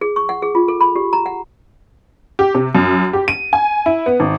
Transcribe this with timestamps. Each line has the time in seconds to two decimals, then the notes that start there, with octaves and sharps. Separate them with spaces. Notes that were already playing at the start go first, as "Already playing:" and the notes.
0.01 G#4
0.16 C#6
0.29 F#5
0.42 G#4
0.55 F4
0.68 A4
0.81 B5
0.96 G4
1.13 A#5
1.26 F#5
2.39 G4
2.55 C3
2.75 F#2
3.13 G4
3.28 D#7
3.53 G#5
3.86 E4
4.06 B3
4.20 G#1